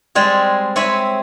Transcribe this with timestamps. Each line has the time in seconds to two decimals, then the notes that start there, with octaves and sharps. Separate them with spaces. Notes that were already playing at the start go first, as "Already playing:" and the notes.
0.15 G3 G#3 C4 G#4
0.76 C4 C#5 E5 G#5 B5